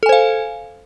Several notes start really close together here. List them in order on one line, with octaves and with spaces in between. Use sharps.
A4 G#5 C5 F5